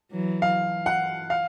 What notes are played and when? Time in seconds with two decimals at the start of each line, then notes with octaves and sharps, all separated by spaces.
0.12 E3 F#3
0.42 F5
0.86 F#5
1.30 F5